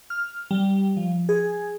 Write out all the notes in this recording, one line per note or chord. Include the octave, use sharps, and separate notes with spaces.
F6
G3
F3
G#4